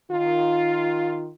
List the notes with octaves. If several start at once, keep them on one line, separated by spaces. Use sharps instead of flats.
D#3 F4